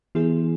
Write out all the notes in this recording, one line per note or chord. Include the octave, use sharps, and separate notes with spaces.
E3 B3 E4 G#4